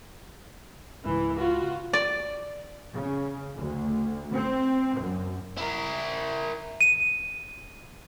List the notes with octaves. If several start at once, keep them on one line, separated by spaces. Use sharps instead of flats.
C#2 G#2 E3
F4 F#4
D5
C#3
D2
C4
F#2
E4 A#4
D#7